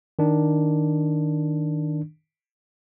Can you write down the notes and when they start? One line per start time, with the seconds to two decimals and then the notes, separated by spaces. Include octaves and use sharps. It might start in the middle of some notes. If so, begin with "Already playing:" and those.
0.19 D#3 D4